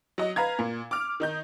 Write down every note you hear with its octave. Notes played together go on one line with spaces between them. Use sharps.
F#3 D#5
B4 F5 A#5 G#6
A#2
D6 F6
D#3 D#4 G6